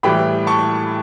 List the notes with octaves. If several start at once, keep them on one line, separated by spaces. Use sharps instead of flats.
A2 E3 G3 G5 B5
A5 C#6